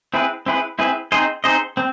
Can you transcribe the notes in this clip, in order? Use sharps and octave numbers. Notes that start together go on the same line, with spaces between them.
C4 E4 G#4 B4
C4 E4 G#4 B4
C4 E4 G#4 B4
C4 D#4 G#4 C5 D#5
C4 D#4 G#4 C5 D#5
C4